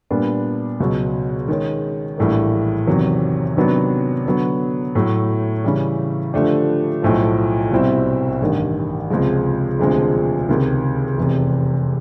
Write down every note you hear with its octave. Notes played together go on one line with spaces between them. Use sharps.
A#2 G3 B3 D4
C#2 B2 F#3
D#3 G#3 C#4
A#1 A2 E3 G3 A#3
E2 C3 D#3 F#3
C3 D#3 F#3 B3 D4
D3 F#3 B3
A2 F#3 A3
C#3 E3 G3
D3 F3 A3 D4 G4
B1 A2 F3
C2 B2 G3 C4 E4
A1 G2 D#3
C#2 C3 F3 G#3
E1 D2 C3 F3 G#3
C#2 C3 D#3
F1 E2 C3